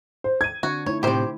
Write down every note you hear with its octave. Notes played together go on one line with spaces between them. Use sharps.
C5
G#6 D#7
D3 C4 D4 F#4
A3 D#4 E4 C#5
A2 C3 G4 C5